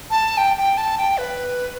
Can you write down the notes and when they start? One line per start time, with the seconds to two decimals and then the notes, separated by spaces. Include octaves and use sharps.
0.11 A5
0.37 G5
0.57 G5
0.77 A5
0.98 G5
1.18 B4